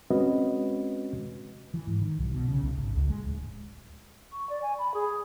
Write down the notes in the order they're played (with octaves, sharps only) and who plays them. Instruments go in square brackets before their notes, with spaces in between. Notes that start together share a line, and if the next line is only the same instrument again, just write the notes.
[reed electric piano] G#3 C4 C#4 F#4 B4 D#5
[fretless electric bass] E3
G#2
D#3
B1
B2
C#3
B1
G#1
C#2
G#3
D1
[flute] C#6
D5
G#5
B5
G#4